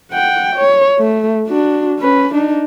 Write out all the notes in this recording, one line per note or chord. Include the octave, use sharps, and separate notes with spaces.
F#5 G5
C#5
A3
D4 F#4
C#4 B4
D4 D#4